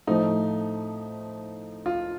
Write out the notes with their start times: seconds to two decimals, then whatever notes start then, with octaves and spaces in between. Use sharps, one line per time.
0.07 A2 F3 A3 D#4
1.86 F4